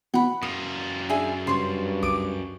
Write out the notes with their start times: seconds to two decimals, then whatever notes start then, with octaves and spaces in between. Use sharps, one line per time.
0.14 B2 E3 B3 F#5 B5
0.43 F#2 F4 D#6
1.09 D4 G#4 E5 G#5
1.47 G2 C#3 C5 C#5 C6
2.03 C#2 D6 D#6 D7